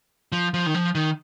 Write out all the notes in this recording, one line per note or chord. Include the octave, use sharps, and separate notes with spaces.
F3
F3
D#3
F3
D#3